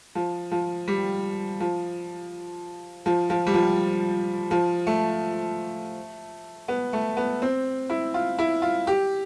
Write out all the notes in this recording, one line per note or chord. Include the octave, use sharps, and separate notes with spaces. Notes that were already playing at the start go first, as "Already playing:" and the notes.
F3
F3
G3
F3
F3
F3
G3
F3
F3
A3
B3
A3
B3
C4
E4
F4
E4
F4
G4